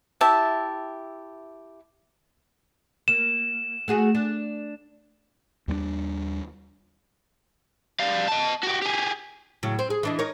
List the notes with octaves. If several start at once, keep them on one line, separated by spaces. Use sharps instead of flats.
E4 G4 E5 A5
A#3 E7
A3 F#4 G#4
D4
D#2 G3 G#3 D4
G3 F5
D#5 A5
F#4 G4
G4 G#4
A2 C#3 F#3
C4
G#4
E3 D4 D#5
D#4 A#4 C#5